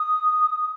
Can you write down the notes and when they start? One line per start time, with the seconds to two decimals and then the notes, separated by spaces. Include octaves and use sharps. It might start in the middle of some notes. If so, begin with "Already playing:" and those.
Already playing: D#6
0.61 D#6